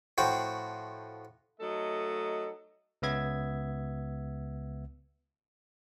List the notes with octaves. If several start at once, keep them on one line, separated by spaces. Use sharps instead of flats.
A2 F3 F#4 G5
F#3 A3 D#4 A4 D#5
C#2 B3 E5 G#6